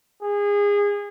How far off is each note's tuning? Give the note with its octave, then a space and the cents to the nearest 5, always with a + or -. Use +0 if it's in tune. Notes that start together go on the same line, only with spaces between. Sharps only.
G#4 -25